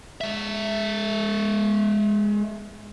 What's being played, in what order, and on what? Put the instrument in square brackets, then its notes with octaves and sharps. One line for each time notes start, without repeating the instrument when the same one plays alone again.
[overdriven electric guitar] G#3 E5